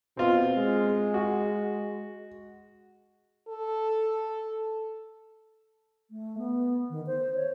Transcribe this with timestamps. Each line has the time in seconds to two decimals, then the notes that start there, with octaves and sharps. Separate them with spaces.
0.17 B2 C4 F4
0.57 G#3
1.14 F#4
3.49 A4
6.11 A3
6.38 B3
6.90 D#3
7.07 C5
7.35 C#5